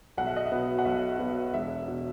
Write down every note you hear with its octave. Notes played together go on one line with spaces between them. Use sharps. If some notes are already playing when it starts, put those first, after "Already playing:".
B1 F#5
E5
D#5
E5
B2 F#3 B3
F#5
B1 E5
B2 F#3 B3
E1 E5
B2